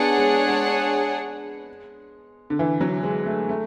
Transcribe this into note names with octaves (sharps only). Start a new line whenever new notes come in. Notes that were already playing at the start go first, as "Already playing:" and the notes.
Already playing: B3 D4 G#4 C#5 F#5
G#3
G#3
D3
E3
F#3
G#3
A3
A3